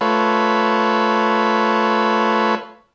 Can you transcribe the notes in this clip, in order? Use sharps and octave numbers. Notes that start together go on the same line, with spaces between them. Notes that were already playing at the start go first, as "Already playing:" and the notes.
A3 F4 B4 C#5